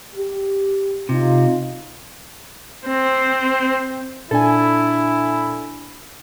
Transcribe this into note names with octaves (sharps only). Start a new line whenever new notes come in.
G4
C3 D#4 F4
C4
A#2 D4 E4 A4 G#5